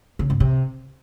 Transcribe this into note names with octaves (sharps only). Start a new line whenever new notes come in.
C#3
G#2
C3